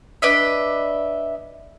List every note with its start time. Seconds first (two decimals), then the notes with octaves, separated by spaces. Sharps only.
0.22 D4 B4 D#5 E5